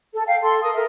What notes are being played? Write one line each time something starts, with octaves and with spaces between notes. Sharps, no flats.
A4
F5 G5
A4 C6
A#4 D#6
A4 A#4 E5